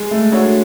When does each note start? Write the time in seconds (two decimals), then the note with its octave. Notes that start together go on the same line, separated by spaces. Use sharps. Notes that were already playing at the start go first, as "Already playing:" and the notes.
Already playing: G#3
0.11 A3
0.32 D4 F#4 A4 C#5